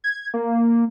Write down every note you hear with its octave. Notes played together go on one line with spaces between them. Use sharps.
G#6
A#3